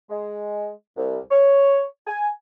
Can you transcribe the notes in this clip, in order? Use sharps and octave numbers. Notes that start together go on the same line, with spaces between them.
G#3
C2
C#5
G#5